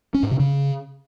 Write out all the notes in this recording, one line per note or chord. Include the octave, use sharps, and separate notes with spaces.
C#4
G#2
C3
C#3